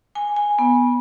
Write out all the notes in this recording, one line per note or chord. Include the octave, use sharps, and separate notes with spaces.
G#5
G#5
B3